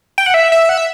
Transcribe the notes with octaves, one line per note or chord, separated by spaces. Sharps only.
G5
F#5
E5
E5
F#5
E5